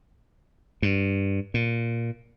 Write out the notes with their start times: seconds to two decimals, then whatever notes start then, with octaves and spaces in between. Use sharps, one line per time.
0.82 G2
1.54 A#2